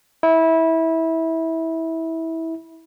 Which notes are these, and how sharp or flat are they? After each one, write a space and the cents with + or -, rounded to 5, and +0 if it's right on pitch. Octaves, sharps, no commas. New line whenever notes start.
E4 -20